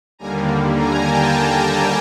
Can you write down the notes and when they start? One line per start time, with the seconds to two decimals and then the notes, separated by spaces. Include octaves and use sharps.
0.19 D#2 D3 G3 A#3 G#5 A#5
0.75 G#5 A#5
1.03 G5 A5